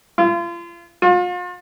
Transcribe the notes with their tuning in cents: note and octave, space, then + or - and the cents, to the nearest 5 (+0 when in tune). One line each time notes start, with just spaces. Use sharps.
F4 -35
F4 +40